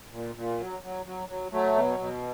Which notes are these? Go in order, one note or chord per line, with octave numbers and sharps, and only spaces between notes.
A#2
A#2
F#3
F#3
F#3
F#3
F#3 A3
B2
B2